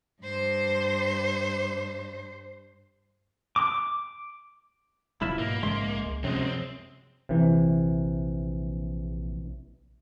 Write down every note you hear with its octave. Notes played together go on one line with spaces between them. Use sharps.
G2 C5
D6
D#1 C#3 F#3 E4 F4 E5
G#2 B2 A#3
A#1 G#2 C#3 G#3 E5 C6
C#2
F#2 C3 F3 G#3 C4 C#4
C4
A#1 C3 E3